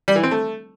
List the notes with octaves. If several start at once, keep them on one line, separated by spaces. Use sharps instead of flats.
G3
E3
C4
A3